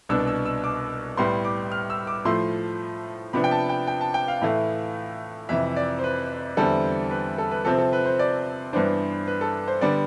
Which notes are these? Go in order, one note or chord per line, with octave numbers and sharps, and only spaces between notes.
C2 B2 B3 D4 E6
E6
E6
D6
A2 G3 B3 C6
D6
F6
E6
D6
A2 F3 A3 C6
C3 F3 B3 D4 B5
G5
A5
G5
G5
A5
G5
F5
A2 E3 A3 E4
F2 C3 E3 E5
D5
C5
B4
E2 D3 G3 C4 E4 A4
B4
A4
B4
C3 F3 C4 A4
A4
B4
C5
D5
G2 E3 B3 D4 C5
B4
A4
C5
D3 G3 B3 D5